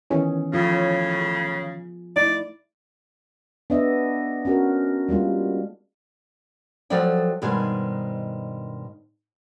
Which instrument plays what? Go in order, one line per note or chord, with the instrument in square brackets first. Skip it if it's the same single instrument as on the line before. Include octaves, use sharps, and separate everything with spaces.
[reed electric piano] D#3 E3 C#4 [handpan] B3 G#4
[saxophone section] A2 C#3 [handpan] F3 F4 G#4
[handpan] G#4
[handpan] A3 E4 [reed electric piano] D#4 [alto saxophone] D5
[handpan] B3 D4 D#5 E5
C#4 F#4 A#4
G3 G#3 A#3 F4
[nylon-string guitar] F3 F#3 A4 D5 G5
G2 B2 D#3 G#3 G#4 C5